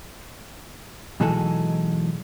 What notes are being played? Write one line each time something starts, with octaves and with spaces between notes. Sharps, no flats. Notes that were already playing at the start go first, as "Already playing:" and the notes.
B2 E3 F#3 G#3 D#4 A4